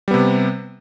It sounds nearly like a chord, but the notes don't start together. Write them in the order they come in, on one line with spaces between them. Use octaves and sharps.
G3 B3 C3